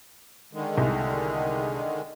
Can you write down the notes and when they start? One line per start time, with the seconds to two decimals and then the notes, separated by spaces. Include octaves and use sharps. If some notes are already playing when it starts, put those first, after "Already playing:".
0.53 D3 D#3 G#3
0.78 C2